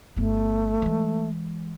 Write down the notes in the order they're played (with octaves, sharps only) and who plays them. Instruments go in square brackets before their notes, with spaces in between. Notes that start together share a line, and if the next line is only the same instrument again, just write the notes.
[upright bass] G1 B3 [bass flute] A3
[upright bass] E3 G#3